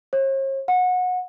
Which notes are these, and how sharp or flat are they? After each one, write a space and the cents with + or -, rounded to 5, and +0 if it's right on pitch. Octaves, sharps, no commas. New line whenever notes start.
C#5 -45
F#5 -25